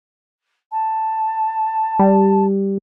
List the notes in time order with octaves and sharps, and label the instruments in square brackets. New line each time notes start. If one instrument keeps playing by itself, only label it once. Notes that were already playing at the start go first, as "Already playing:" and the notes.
[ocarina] A5
[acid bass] G3